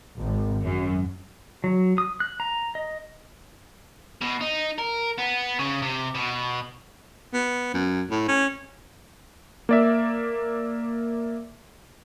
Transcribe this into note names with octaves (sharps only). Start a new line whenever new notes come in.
G#1
F#2
F#3
D#6
F#6
A#5
D#5
B2
D#4
A#4
B3
C#3
C3
B2
B3
F#2
A2
C#4
A#3 D5 E5